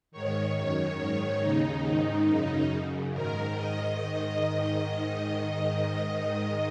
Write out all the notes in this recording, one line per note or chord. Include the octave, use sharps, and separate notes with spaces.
G#2 D#3 C#5
F#2 D#3
G#2 D#3
D#2 C#3 D#4
G#2 D#3 D#4
F#2 C#3
F#2 C#3
G#2 D#3 A#4
G#2 D#3 D#5
G#2 D#3